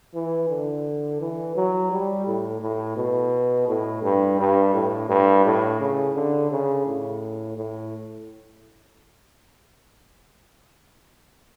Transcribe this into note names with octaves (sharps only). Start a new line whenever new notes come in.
E3
D3
E3
F#3
G3
A2
A2
B2
A2
G2
G2
A2
G2
A2
C#3
D3
C#3
A2
A2